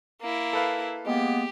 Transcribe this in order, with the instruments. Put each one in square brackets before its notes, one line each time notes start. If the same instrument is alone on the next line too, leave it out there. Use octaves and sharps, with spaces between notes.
[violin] A#3 E4
[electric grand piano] A4 B4 F5
[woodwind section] G#3 A#3 B3 [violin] G4